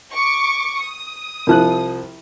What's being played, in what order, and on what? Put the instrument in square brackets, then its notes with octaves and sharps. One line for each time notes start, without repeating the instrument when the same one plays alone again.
[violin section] C#6 D6
D#6
[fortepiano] C2 F3 F#6